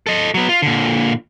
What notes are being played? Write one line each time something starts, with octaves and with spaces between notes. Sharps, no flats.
A4 D#5
F#3 B3
F4
A#2 D3